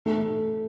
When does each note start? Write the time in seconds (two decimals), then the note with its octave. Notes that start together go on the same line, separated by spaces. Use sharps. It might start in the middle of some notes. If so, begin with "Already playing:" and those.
0.06 A3